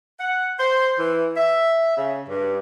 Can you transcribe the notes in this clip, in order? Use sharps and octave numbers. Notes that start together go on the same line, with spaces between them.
F#5
C5
E3
E5
C#3
G2